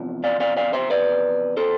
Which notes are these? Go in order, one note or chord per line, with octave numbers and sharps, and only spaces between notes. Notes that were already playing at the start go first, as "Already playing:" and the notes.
Already playing: E2 C3 F3
D5 F5
D5 F5
D5 F5
C5 E5
B4 D5
A4 C5